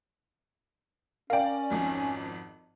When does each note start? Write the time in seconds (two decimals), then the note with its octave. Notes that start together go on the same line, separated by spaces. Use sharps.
1.30 C#4 A#4 D5 F5 G5
1.70 G#1 F2 G#2